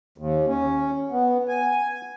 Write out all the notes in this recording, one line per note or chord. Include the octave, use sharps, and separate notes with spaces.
D#2
C#4
B3
G#5